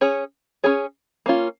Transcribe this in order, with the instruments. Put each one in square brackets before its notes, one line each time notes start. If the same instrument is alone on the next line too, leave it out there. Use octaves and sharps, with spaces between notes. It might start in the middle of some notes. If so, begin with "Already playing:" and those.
[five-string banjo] C#4 G#4 C#5
C#4 G#4 C#5
A#3 C#4 F4